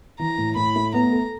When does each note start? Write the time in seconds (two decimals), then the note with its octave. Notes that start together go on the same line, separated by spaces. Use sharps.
0.19 E3 A#5
0.38 A2
0.56 A2 B5
0.76 A3
0.94 B3 A#5
1.12 A4